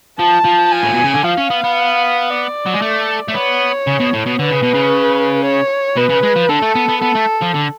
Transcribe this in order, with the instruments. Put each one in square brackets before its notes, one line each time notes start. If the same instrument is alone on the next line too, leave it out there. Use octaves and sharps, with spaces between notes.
[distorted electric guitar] F3 [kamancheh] A5
[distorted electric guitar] F3
[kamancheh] G#5
[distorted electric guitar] A2
B2
C#3
D3
[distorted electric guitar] F3 [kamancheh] F5
[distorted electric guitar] C#4
B3
B3
[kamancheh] D5
[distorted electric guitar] F#3
G#3
A3
A3
[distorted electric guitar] B3 [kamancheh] C#5
[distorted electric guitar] C#3
B2
A2
B2
[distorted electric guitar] D3 [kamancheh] B4
[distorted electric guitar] C#3
B2
C#3
[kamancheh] C#5
[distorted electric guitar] B2 [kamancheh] B4
[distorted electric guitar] C#3
G#3
F3
[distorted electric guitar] D3 [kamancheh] A4
[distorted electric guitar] A3
B3
B3
[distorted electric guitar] B3 [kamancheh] A4
[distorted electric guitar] A3
F3
D3